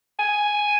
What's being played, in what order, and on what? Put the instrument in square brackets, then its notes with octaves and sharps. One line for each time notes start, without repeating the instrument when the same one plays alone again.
[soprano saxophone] G#5